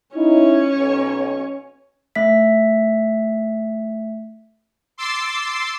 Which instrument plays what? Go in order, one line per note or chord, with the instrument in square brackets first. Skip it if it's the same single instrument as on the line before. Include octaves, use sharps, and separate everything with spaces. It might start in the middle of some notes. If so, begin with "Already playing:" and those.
[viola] C#4 C#5 [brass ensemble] D#4 E4
[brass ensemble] B1
[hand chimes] A3 E5 B6
[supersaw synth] C6 D6 E6 A6 C7